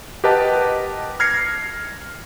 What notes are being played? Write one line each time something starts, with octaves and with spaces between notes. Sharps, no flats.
G4 A#4 B4 D#5 F#5 A5
F6 G#6 A#6 C7 C#7